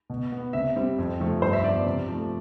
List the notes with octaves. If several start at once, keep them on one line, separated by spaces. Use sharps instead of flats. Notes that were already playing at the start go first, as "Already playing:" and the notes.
B2
B3
C3 E5
G3 C4
F2
C3 F3 A3
G2 C5
E5
F3 B3 D5
D5
C3
F3 A3